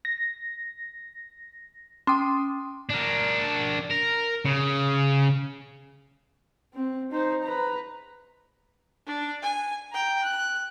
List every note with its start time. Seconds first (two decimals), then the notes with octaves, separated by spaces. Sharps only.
0.05 A#6
2.07 C#4 G5 C6 D6 D#6
2.90 D4 A#4
3.90 A#4
4.45 C#3
6.74 C4
7.11 D#4 C5
7.43 B4 A#5
9.07 D4
9.42 G#5
9.92 G5 A#5
10.23 F#6